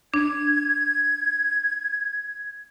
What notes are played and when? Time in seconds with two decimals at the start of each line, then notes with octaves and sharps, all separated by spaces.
0.14 D4 G#6